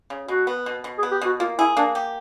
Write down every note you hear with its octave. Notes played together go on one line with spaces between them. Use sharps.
C#3
B2 F#4
B3
B2
B2
G#4
B3
G4
B2 F#4
A#3 F4
E4 G#4
A#3 D4
G4